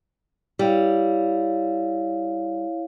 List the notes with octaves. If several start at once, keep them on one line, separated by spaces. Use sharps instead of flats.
G3 E4 C#5 F5